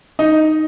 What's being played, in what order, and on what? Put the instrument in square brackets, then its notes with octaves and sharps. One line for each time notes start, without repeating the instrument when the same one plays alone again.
[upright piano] D#4